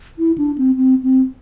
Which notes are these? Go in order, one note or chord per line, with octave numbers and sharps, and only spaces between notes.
E4
D4
C4
C4
C4